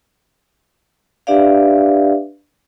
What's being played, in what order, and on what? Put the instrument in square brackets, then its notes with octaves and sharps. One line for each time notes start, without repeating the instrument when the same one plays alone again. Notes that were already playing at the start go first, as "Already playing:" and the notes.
[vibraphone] D4 G4 B4 D5 E5 F5